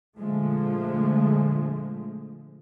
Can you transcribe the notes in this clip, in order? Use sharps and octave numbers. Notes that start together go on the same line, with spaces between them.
A#2 D3 F3 G#3 A3